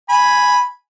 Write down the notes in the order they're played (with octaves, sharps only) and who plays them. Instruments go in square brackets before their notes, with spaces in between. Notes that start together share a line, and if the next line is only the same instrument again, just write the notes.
[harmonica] G#5 B5